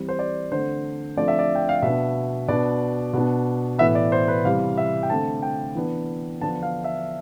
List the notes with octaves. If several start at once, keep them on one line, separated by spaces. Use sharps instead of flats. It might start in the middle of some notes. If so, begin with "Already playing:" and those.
Already playing: E3 G3 C4
C5
D5
D3 A3 C4 C5
D3 F3 A3 C4 D5
E5
D5
G5
F5
B2 B3 D4 E5
B2 B3 D4 D5
B2 B3 D4
A2 E3 B3 E5
D5
C5
B4
C3 E3 G3 F5
E5
G5
D3 A3 C4 A5
G5
E3 B3 D4
D3 F3 B3 D4 A5
F5
E5